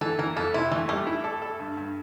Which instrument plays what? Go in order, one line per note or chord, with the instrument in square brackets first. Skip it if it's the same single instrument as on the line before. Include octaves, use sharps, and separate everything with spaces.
[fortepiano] E3 [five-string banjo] A4
[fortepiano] E3 [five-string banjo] A#4
[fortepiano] F2 [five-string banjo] A4
[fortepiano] C3 [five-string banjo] E4
[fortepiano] E3 [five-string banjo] A3
[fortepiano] G3 [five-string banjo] A3
[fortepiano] E4
A4
A4
G2
G2